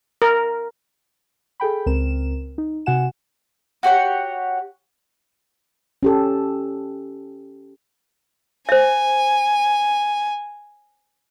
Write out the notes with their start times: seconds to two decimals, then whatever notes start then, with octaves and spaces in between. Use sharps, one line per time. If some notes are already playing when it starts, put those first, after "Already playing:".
0.22 A#4
1.60 G#4 A4 G5 B5
1.86 C#2 C4 A#4 E7
2.58 D#4
2.86 C3 F#4 F#5 G#5 E7
3.83 F#4 G4 C#5 F#5
6.03 C#4 G4 A4
8.69 C5 E5 G#5